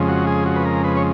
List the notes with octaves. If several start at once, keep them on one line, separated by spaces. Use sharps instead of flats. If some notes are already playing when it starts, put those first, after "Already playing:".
Already playing: F2 C#3 G#3
F#4
G#4
F#4
B4
A#4
B4
C#5